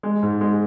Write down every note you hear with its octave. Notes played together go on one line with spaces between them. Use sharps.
G#3
G#2
G#3